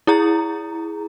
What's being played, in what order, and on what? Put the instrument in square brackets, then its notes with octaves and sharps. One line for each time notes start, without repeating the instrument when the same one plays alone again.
[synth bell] E4 G#4 A#5